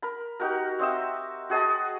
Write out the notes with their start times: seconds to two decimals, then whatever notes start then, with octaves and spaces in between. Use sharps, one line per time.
0.02 A#4 B5
0.40 D#4 F#4 G4 A#4
0.79 C4 D#5 E5 E6
1.50 F#4 G#4 D#5 A5